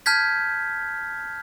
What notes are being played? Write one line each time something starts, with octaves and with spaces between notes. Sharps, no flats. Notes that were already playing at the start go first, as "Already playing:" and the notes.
A5 F6 G6 G#6 B6